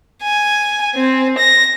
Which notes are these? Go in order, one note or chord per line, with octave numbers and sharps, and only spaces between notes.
G#5
C4
A#6